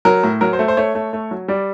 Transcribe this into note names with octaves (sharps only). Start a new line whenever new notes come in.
F#3 A#4
A2
F#3 A#4
C5
A3
C5
A3 C#5
A3
A3
F#3
G3 D5